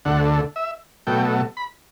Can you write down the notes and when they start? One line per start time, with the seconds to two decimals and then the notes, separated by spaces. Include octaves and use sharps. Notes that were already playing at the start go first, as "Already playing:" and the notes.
0.05 D2 D3 A3 F#5
0.56 E5
1.07 B2 F#3 A3 G5
1.57 B5